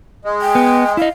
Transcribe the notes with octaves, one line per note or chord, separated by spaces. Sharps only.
G#3
G5
B3
E4 D#5 F5